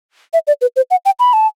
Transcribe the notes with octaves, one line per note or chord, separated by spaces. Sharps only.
E5
D5
B4
C5
F#5
G5
B5
A5